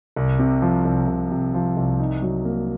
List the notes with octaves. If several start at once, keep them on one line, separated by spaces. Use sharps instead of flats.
C2
C3
F3
C2
C2
C3
F3
C2
D#4
F#3
A#3